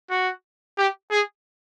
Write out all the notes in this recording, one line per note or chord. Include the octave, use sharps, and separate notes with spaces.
F#4
G4
G#4